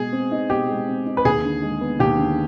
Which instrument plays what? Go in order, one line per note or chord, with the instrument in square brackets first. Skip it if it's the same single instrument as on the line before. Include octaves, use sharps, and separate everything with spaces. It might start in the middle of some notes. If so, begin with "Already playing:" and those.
Already playing: [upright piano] B2 G#3 [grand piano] G#4
[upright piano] C4
D#4
[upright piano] B2 [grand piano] G4
[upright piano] G#3
C4
D#4
[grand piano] B4
[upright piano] D#2 [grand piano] G#4
[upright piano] D3
G#3
B3
[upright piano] D#2 [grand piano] G4
[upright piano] D3